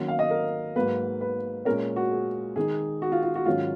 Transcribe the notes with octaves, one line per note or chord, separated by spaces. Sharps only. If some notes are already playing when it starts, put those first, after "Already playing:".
Already playing: D#3 F#3 A#3 C#4
F5
D#5
A#4
G#2 F#3 A#3 B4
B4
A#2 G#3 C#4 A#4
F#4
G#4
D#3 G#3 D#4 G#4
F#4
F4
F4
F#4
G#2 D#3 F#3 C#4 F4